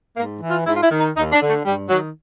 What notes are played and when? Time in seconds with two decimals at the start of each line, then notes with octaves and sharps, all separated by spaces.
0.17 G#2 A#3
0.41 E3
0.50 F4
0.67 G#2 E4
0.75 F4
0.83 E4
0.91 D#3
1.00 D#4
1.16 D#2 D#4
1.33 D4
1.41 D3
1.48 A3
1.65 G2 G3
1.90 D#3 F#3